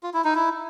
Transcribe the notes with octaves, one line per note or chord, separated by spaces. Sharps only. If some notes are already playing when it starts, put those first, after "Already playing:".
F4
E4
D#4
E4